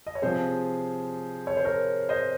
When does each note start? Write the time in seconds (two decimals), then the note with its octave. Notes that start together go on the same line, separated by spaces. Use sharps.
0.06 D#5
0.15 C#5
0.22 C3 F3 G#4 C5
1.47 C#5
1.57 C5
1.65 A#4 C#5
2.09 C5 D#5